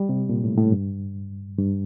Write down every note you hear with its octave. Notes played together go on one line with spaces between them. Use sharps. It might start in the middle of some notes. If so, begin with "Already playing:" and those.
Already playing: G3
C3
A#2
A2
A2
G2
G2